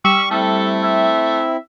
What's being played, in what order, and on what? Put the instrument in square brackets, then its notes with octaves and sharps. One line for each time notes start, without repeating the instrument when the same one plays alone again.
[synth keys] G3 [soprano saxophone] C#6 [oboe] E6
[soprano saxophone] A3 [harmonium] C4 E4 [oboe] A4
[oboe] E5